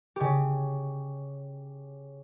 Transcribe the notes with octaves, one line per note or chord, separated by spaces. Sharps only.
C#3 G4